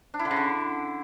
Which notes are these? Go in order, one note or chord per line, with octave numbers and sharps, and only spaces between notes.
D4
E4
D3
C#3
D3